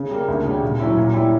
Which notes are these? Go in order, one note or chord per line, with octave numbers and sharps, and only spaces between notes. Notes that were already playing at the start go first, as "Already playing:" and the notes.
Already playing: C#3
G3 A#3
D2
C#3 G3
A#2
F#3 C#4 E4
A#2
G3 C#4 E4